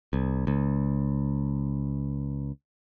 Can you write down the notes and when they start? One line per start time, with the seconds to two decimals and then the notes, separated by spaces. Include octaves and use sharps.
0.13 C2
0.47 C#2